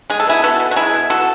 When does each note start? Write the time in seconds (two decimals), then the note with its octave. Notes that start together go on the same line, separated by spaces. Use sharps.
0.10 G#3 G#4
0.20 A4
0.27 B2 E4 G#4
0.43 B3 F#4 A4
0.60 B2
0.71 F#4
0.76 G#3 E4 G#4
0.94 B2
1.10 B3 F#4 A4